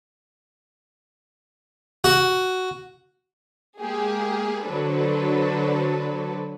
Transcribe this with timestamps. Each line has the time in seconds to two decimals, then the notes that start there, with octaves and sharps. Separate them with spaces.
2.04 F#4
3.80 G#3 A#3 G4 G#4
4.65 D3 F#3 D4 A4 B4 C5